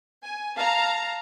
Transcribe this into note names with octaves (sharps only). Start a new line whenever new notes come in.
G#5
F5 A5 A#5